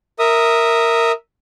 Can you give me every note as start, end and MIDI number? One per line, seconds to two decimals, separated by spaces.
0.19 1.12 70
0.19 1.12 76
0.19 1.12 87